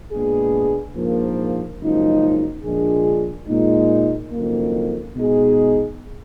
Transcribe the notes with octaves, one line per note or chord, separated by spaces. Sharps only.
A#2 G#3 B3 D4 G#4
A#1 G#2 F3 A#3
F#1 F#2 F3 G#3 D#4
A#1 A#2 G#3 D4 G#4
A#2 G#3 D#4
F#1 F2 D#3 A#3
B2 G#3 D#4 G#4